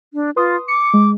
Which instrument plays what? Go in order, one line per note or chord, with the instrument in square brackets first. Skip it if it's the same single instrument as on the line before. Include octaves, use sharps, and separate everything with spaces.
[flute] D4
[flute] F4 [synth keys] B4 C6 D#6
[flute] D6 [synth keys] C#7
[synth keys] G#3